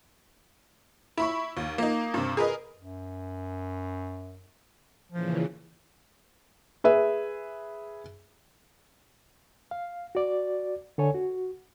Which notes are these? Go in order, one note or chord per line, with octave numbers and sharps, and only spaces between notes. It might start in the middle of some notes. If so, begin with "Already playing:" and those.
E4 B5 C#6
D#2
A#3 D#4
G2 C3
G#4 A#4 B4 D#5
F#2
A#2 C#3 E3 F3
G#4 B4 E5
F5
F#4 D5
D3 A4 C#5 G#5
F#4